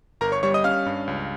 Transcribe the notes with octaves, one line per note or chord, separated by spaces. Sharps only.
G1 A#4 A#5
C#5 C#6
G3 C#5 C#6
D#5 D#6
C#4 F5 F6
G2
C#2